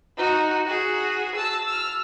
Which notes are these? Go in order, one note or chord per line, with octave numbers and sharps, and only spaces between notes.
D#4 F#4
F#4 G#4
A5 E6
E6 F6